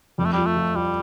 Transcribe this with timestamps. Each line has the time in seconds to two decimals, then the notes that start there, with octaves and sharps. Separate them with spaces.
0.18 F2 G3
0.25 A3
0.33 G3 F4
0.46 A3
0.56 F3
0.75 G3 F4